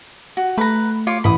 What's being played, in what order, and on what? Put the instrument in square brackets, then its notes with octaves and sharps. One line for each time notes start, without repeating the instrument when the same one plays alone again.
[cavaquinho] F#4
[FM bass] A3 [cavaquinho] B4 A#5
[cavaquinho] F4 C#5 D6
[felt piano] A1 [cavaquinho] B5 D#6